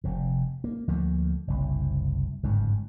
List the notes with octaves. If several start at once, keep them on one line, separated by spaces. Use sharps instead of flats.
F1 C3
A#3
D2 F3 A3 A#3
F#1 C2
G1 F2 G#2 C#3